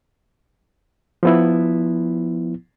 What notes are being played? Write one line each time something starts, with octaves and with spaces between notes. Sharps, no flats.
F3 B3 E4